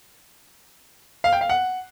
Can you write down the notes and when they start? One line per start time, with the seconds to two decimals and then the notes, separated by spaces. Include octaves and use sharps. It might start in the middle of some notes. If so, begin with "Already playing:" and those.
1.24 F5
1.33 G5
1.41 F5
1.49 F#5